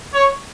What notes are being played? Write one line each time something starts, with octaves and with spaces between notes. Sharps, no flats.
C#5